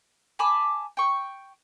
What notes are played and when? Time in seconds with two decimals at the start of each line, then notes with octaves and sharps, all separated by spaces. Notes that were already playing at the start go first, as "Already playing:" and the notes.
0.39 G#5 A5 B5 D6
0.97 G5 C#6